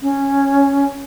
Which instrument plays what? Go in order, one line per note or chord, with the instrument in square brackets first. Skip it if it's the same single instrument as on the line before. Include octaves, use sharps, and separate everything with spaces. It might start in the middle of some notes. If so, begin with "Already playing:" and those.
[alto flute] C#4